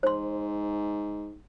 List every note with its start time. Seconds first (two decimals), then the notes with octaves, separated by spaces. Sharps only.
0.03 G#2 C5 C6